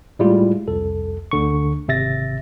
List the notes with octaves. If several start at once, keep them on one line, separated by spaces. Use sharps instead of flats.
A2 G3 G#3 E4 F4
C2 F2 A4
D2 D3 C#6
G#1 C3 E5 A6 A#6